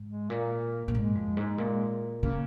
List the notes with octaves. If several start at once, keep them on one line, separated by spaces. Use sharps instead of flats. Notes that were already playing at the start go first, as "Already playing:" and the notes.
Already playing: G#2
G#3
A#2 A#3
A#2
G#2 G#3
F2
G#2
A#2
C#3 A#3